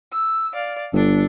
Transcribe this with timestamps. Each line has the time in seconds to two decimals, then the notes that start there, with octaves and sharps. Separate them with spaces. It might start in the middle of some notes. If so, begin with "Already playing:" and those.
0.12 E6
0.54 D5 F5
0.93 G1 D4 A4